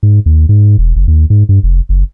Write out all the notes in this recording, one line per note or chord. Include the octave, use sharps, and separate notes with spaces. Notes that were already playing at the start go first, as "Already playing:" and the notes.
G#2
D#2
G#2
E1
F#1
D#2
G#2
G2
F1
F#1